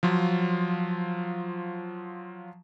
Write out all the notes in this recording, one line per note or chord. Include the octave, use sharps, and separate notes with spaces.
F3 F#3 F4